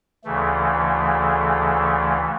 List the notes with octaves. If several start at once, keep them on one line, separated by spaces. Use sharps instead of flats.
D2 C#3 E3 A3